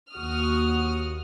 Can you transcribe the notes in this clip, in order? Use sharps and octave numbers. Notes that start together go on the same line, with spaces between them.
D#2 F#4 D#6 F6